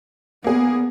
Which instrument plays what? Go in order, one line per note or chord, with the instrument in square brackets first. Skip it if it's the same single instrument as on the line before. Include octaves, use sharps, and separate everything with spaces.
[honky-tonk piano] A#3 G#4 [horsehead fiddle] B3